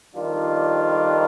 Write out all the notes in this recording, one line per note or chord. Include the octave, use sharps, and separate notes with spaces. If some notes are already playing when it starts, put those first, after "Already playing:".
F2 D#3 G3 D4 F4